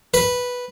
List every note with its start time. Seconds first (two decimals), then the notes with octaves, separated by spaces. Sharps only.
0.14 B4